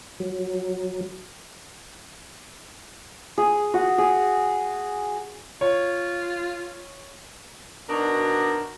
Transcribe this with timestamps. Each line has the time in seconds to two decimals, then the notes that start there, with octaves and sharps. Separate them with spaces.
0.20 F#3
3.38 G#4
3.74 F#4
3.98 G#4
5.61 F4 C#5
7.89 B2 D4 D#4 F#4 A#4 D5